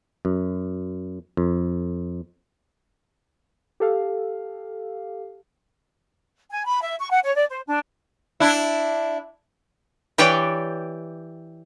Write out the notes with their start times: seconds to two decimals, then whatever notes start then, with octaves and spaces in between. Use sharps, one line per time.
0.25 F#2
1.37 F2
3.80 G4 A4 F5
6.50 G#5
6.64 B5
6.81 E5
6.99 C#6
7.10 F#5
7.22 C#5
7.34 D5
7.49 C5
7.66 D4
8.40 D4 E4
10.18 E3 G4 B4 C#5 D5 G5